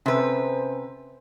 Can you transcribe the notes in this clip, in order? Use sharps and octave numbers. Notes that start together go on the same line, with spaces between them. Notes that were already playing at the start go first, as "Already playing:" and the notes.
C3 C#4 B4 C5